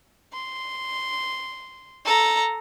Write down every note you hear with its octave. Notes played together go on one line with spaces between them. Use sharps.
C6
A4 A#5